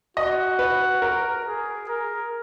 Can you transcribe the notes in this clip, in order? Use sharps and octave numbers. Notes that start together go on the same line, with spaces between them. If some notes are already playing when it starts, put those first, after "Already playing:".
F#4 D#5
B4
A#4
G#4
A#4